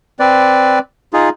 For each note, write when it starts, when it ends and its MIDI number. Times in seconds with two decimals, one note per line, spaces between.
0.20 0.79 60
0.20 0.79 71
0.20 0.79 74
1.13 1.29 63
1.13 1.29 65
1.13 1.29 68